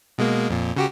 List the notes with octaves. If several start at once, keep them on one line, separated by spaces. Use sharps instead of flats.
B2 G#3 A#3
F2 A#2
C#3 F#4 G4